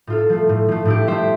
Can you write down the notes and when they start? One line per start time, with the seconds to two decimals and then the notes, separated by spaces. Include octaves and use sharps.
0.07 A2 F4 A4
0.30 F3 A3
0.49 A2
0.68 F3 A3
0.85 A2 E4 G4
1.07 F3 A3 C5 E5